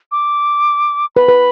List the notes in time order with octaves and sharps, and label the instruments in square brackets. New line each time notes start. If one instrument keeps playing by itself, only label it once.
[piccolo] D6
[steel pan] B4 [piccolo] B5
[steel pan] B4